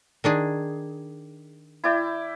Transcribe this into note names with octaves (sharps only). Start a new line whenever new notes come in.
D#3 D4 G#4
E4 D5 G5